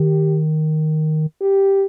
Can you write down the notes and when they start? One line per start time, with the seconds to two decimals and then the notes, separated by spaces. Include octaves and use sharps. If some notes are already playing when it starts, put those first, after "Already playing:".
Already playing: D#3 G4
1.41 G4